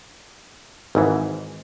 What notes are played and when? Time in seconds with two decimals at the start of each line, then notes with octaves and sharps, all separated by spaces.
0.95 G#1 G#2 E3